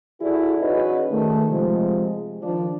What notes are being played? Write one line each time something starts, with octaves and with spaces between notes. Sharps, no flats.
E3 E4 F#4 G#4 A4 D5
C#4 D#4 F#4 G#4 B4 D#5
D#3 A3
C3 F3 G#3
D#3 F3 D4